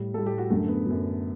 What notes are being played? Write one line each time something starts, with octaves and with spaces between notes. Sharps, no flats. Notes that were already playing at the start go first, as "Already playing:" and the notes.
Already playing: A2 G3
A2 G3 A4
G4
F#4
F#2 D3 F#3 A3
B3
F#2 D3 F#3